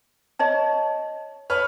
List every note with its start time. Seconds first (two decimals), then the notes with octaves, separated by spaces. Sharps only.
0.39 C#5 D#5 A5
1.50 B4 C#5 F6